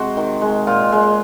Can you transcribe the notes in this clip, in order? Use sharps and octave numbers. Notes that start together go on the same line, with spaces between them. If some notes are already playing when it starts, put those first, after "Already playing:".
Already playing: C3 G#3 F#4 C5
D#3
G#3
A#2 F4
G#3